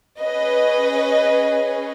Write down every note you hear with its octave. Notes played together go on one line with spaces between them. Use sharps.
C#4 G#4 B4 D#5